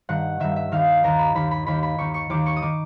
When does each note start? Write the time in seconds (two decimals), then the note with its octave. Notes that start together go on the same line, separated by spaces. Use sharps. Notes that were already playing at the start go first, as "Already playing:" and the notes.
0.09 G2 D#3 F#5
0.40 G2 D#3 E5
0.56 E5
0.72 D#2 D#3 F5
1.03 D#2 D#3 A#5
1.19 B5
1.35 D#2 D#3 B5
1.51 B5
1.66 D#2 D#3 B5
1.83 B5
1.98 D#2 D#3 C#6
2.14 C#6
2.30 D#2 D#3 D6
2.46 C#6
2.56 D#6
2.62 D#3 D6